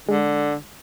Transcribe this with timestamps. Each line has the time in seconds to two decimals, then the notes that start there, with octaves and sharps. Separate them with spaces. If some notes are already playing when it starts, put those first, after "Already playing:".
0.09 D3 G#3